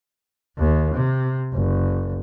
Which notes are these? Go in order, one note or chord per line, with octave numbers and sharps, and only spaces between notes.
D#2
C3
F#1